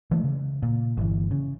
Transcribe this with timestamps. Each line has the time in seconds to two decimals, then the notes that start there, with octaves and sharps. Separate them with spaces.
0.11 E3 G#3 A3
0.24 C#3
0.62 A#2
0.97 G1 E3
1.31 C#3